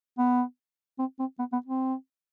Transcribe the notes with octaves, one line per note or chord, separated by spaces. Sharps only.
B3
C4
C4
B3
B3
C4